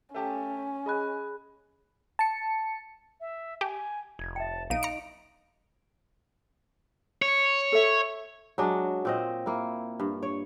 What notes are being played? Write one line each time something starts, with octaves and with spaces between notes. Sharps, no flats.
A3 C#4 G4 A5
G#4 D#5 G#5 B5 F#6
A5 C#7
E5
G4 G#5 A5
F1 G#6
E5 G5 A5
B1 D#4 F5 D7 D#7
A#5 C#7
C#5
A4 E5
F#3 G#3 D4
A#2 C4 D#5
A#3 E4
G2
C#5